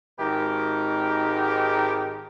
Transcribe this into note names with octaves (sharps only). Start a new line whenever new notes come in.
G#1 G#2 D#4 G4 A#4